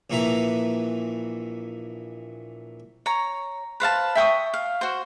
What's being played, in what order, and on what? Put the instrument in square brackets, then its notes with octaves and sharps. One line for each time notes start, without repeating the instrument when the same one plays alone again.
[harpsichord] A#1 A#2 E3 B4 E5 A#5
[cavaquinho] C#5 A#5
B4 C5 F5 A5
E5 G5 C#6 D#6
F5
F#4 C5